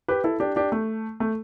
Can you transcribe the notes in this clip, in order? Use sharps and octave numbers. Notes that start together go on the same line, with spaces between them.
G4 B4
E4 A4
D4 G4
D4 G4
A3
A3